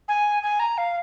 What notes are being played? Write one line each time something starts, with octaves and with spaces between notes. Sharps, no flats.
G#5
G#5
A#5
F5